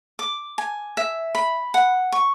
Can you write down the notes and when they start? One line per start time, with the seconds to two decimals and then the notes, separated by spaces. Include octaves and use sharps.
0.19 D6
0.58 G#5
0.97 E5
1.35 B5
1.74 F#5
2.12 C#6